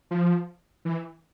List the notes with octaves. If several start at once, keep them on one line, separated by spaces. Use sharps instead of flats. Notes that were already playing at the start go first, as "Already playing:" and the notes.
F3
E3